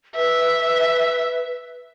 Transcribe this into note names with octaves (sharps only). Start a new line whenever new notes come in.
B4 E5